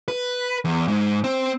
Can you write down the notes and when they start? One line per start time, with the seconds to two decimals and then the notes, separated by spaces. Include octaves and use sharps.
0.08 B4
0.65 E2
0.88 G#2
1.24 C4